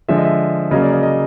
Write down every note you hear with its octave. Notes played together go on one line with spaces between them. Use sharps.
D3 F3 G#3 E5
D#5
E5
C#3 F#3 A#3 D#5
D5
D#5
D#5